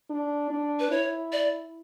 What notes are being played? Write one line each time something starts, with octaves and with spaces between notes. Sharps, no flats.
D4
D4
B4
E4 C#5
D5